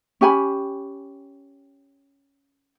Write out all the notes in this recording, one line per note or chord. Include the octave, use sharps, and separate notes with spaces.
C#4 G4 G#5 B5